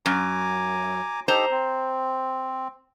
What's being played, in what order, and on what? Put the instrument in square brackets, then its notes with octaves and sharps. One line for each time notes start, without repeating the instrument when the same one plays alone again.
[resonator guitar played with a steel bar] F#2 [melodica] G#5 A#5 D6
[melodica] D#4 G4 A4 [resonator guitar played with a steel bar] C5 A#5
[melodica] C4